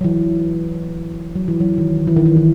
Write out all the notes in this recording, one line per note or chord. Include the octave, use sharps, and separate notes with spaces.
F#3
E3
F#3
E3
F#3
D#3
E3
D#3
E3
E3